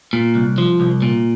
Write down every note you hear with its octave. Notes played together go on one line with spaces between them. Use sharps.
A#2
C2
F3
C2
A#2